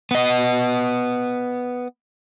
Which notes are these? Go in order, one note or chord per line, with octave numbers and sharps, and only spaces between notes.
B3 D#5